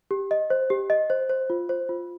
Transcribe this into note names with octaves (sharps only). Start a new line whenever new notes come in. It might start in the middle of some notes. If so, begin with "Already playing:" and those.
G4
D#5
C5
G4
D#5
C5
C5
F4
C5
F4